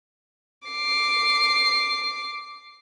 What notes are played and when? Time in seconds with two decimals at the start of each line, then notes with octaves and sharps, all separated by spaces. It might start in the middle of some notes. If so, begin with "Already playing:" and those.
0.68 D6 C7